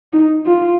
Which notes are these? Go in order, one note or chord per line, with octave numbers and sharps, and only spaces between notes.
D#4
F4